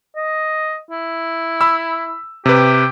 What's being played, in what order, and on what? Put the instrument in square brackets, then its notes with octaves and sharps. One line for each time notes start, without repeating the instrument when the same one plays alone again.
[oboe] D#5
E4
[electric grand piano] B5 E6
[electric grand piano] C3 B4 [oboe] G4